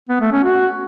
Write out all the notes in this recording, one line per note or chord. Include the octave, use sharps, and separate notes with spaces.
B3
A3
C#4
F#4